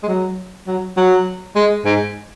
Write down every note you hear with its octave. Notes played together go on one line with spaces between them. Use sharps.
G#3
F#3
F#3
F#3
G#3
G#2